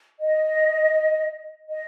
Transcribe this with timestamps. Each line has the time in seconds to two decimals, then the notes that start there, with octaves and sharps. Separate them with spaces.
0.20 D#5
1.69 D#5